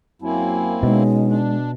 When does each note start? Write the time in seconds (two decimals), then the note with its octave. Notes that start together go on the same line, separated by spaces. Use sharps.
0.22 F#2 F#3 A#3 C4 E4 G#5
0.83 B2 G#3 C#4 D#4
1.27 D4